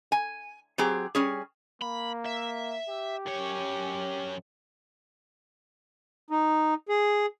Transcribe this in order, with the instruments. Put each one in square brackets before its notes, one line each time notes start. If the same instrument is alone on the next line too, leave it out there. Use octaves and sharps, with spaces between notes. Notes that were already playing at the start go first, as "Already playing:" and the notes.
[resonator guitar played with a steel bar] G#5
F#3 C4 G4 G#4
G3 C#4 G#4
[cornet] A#3 [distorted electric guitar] B5
[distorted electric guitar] E5
[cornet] G4
[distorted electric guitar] F#2 C#5
[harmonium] D#4
G#4